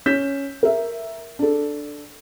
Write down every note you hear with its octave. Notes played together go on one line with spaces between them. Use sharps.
C#4 G6 B6 E7
A#4 E5
D4 A4